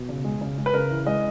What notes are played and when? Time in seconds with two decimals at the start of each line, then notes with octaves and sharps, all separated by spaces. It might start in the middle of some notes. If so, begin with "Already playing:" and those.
Already playing: B2
0.09 C#3
0.25 G#3
0.41 C#3
0.58 G#3
0.66 B4
0.74 C#3 A#4
0.90 E3
1.06 G#3 D#5